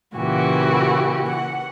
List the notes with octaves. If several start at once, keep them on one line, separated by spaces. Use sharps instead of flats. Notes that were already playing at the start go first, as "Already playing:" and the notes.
A#2 C#3 E3 F#4 G4
F#5